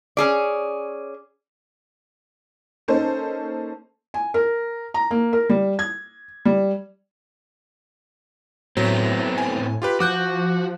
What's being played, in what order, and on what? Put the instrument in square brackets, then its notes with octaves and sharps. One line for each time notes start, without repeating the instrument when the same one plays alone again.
[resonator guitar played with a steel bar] C#4 G#4 D5
[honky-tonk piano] A#3 C#4 D#4 A4 C5
[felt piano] G#5
A#4
A#5
A#3
A#4
G3
G#6
G3
[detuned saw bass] A2 [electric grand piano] F#3 [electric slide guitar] A3 B3 C4
[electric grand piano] G#5
F4 G4 B4
[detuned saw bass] F3 [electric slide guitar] F#4 [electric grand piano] D6 F#6 G6